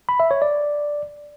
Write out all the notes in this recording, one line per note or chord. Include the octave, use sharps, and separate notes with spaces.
B5
E5
C#5
D5